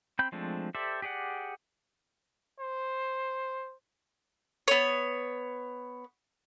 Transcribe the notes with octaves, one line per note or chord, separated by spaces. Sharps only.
C4 G5 B5 G6
F3 G#3 A3 C4 D4
G4 A4 C5 D5 E5
G4 G#4 D5 F#5
C5
B3 C#5